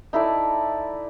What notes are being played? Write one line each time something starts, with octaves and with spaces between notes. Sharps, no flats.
D#4 E4 A4 D5